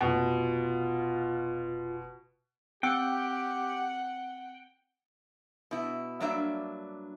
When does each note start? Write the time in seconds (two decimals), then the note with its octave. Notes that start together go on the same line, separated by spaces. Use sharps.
0.01 F1 B2 F4
2.83 C4 G4 F#5 G5 E6 C#7
5.71 B2 E4
6.20 G2 F#3 A#3 D4 E5